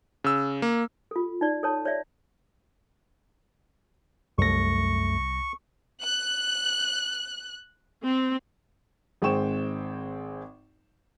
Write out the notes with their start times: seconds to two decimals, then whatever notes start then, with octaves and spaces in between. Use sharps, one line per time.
0.24 C#3 E6
0.62 A#3
1.11 F4 A4
1.41 D#4 D5
1.63 A4 C#5 A5
1.85 C#5 D5 E5
4.38 C2 F#2 A3 C#6 A#6
6.02 F#6
8.04 C4
9.22 G#1 G#3 C4 G5 C#6 E7